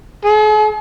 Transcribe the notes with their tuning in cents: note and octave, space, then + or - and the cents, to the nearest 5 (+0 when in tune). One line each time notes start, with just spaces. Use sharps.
G#4 +45